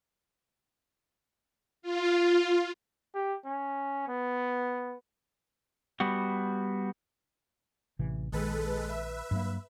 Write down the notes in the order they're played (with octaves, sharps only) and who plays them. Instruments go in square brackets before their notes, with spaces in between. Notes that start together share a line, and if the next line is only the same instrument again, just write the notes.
[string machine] F4
[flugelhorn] G4
C#4
B3
[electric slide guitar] G3 B3 F#4
[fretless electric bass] A1 C3 E3
[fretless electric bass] A#1 D#3 [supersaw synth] G#3 A4 B4
[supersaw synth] B4 E5
[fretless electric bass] G2 F#3 A#3